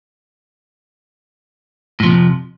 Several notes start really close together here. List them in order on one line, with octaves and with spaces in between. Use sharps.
A2 F3 C3 F2